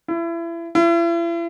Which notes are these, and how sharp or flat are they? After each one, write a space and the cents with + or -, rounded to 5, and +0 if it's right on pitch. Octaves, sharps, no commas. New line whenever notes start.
E4 +30
E4 +40